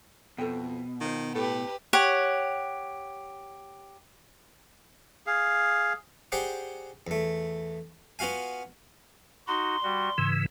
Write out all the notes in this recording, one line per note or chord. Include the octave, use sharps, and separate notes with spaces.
F2 B2 A4 C5 G5
D#3 F4 C5
A2 G4 A4 B4
G4 C#5 F#5
G#4 F5
G4 G#4 C5 D5 F#5
E2 A3
B3 F4 F#4 F5 G#5
D#4 F#4 C6
G3 F#4
G#2 C#3 E3 E6